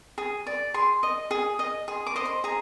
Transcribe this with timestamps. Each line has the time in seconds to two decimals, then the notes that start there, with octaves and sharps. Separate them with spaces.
0.18 G#4
0.47 D5
0.74 G#4 C6
1.03 D#5
1.31 G#4
1.59 D#5
1.88 G#4 C6
2.06 D6
2.16 C5 D#5
2.25 C6
2.44 G#4 A#5